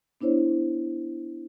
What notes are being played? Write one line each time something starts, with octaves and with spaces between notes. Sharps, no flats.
B3 D4 E4 C5 C#5